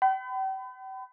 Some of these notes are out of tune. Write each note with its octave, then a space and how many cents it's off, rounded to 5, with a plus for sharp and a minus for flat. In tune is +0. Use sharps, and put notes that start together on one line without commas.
G5 -40 B5 +35